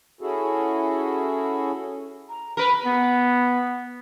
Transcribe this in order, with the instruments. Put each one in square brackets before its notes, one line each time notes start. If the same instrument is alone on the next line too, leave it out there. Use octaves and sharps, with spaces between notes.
[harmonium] C#4 E4 F#4 G#4 A4
[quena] A#5
[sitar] A#4 B4 [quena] B5
[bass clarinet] B3